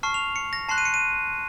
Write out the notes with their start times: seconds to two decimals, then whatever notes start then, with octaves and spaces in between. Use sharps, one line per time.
0.03 A5 C#6 F6 C7
0.14 F7
0.36 C#7
0.53 A#6
0.69 A5 C6 F#6 C7
0.78 D#7
0.85 C#7
0.94 D#7